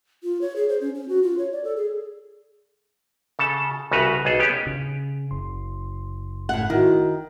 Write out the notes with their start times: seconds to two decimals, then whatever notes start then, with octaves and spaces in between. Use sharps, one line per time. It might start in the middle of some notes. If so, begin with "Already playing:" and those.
0.23 F4
0.41 C#5
0.56 G#4
0.69 C5
0.81 C#4
0.95 C#4
1.09 F#4
1.23 F4
1.39 C#5
1.52 D5
1.64 A4
1.76 G#4
3.39 C#3 A4 A5
3.91 C2 C#3 F#4 B4 A#5
4.25 B1 G#4 A4
4.39 B3 C#4 G4
4.66 C#3
5.31 F#1 C6
6.49 A2 F#5
6.70 D#3 E4 F#4